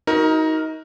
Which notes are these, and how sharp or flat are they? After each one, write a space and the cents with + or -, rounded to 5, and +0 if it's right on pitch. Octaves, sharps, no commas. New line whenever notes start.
D#4 +25 F#4 +0 A#4 +0